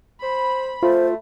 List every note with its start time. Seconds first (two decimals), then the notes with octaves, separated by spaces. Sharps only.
0.23 C5 B5
0.83 A3 F4 C5